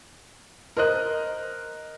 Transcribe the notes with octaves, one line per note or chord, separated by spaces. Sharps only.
A#4 C5 D#5 F#6